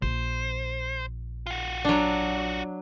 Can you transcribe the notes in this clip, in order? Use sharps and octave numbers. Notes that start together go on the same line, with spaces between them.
A#1 C5
F4 F#4
F#3 D4